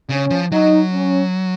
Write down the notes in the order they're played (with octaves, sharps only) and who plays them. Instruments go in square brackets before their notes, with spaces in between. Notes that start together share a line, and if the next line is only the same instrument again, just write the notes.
[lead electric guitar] C#3 [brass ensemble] C#4
[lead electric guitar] F3
[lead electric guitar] F#3 [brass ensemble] D#4
[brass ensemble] C#4